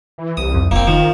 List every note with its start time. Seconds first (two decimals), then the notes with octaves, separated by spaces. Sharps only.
0.18 E3
0.37 C2 D#6
0.55 F2
0.71 F1 A#1 A#3 C4
0.87 D#3 F3